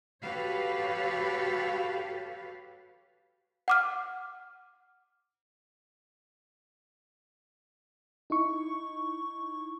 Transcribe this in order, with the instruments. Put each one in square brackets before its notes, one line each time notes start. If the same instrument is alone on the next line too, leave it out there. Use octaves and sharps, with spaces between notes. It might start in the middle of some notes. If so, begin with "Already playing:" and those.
[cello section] F#4 G4 A4 B4 C#5 F5
[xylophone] F#5 D6 F6
[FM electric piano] D#4 E4 C#6